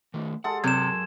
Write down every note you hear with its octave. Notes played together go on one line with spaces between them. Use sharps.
D#3 A3
G#3 A4 F#5 C6
C3 F#3 A#4 G#6 E7